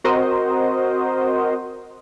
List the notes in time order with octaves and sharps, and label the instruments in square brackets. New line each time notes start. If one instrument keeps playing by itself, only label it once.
[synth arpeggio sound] C4 F#4 A#4 C5 D#5